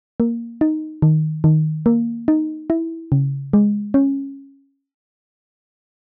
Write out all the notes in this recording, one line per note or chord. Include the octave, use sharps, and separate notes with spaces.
A#3
D#4
D#3
D#3
A#3
D#4
E4
C#3
G#3
C#4